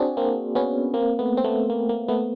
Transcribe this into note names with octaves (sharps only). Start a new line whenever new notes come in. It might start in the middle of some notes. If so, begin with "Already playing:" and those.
Already playing: C4 D4 F#4 G#4
A#3 C4
B3 C#4
A#3 C4
A3 B3
C4
A3 B3
A#3
A#3
A3 B3